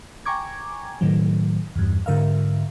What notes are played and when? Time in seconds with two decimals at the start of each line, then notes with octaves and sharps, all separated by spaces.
0.26 G5 G#5 A#5 C#6 D6 G#6
1.01 A2 D#3 F#3
1.76 E2 G2
2.06 G#2 D3 A#4 E5 F5